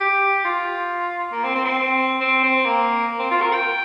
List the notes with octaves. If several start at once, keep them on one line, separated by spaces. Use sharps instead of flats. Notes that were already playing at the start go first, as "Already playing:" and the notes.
G4
F4
A#3
C4
C4
C4
C4
C4
A#3
C4
F4
A#4
G5